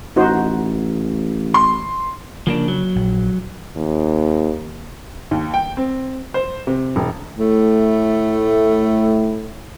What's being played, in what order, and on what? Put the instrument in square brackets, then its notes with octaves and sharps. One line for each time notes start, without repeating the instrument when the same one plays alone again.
[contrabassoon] A1 [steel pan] D#4 F#4 C5
[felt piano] C6
[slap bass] C#3 [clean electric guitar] F3 A#3 D4
[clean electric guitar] F#3
[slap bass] A#1
[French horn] D#2
[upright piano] D#2
G5
C4
C5
C3
E1
[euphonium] A2 [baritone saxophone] A3